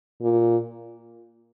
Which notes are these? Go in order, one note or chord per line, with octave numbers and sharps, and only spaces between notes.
A#2